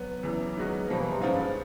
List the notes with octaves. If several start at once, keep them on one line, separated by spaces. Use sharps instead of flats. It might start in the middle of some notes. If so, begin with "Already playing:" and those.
Already playing: F#3 B3
E2 C#3 E3
D#3 G#3 B3 D#4 F#4
B2 F3 G3 A#3
E3
C3
G#2 F3 G#3 C#4 F4
G2